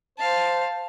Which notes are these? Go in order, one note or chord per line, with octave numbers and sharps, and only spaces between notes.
C5 F5 A5